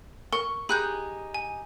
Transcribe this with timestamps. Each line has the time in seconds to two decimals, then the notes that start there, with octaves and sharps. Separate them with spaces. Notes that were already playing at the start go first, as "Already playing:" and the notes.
0.33 A#4 C#6
0.69 D#4 G4 G#4 B5 F#6 G6
1.34 G#5